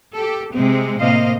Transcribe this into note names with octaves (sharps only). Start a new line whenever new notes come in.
G4 A4
C3 G#3 C4
A2 C3 A#3 C5 D#5 F5